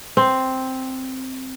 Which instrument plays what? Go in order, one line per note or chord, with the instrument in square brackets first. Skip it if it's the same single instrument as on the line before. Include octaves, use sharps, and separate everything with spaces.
[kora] C4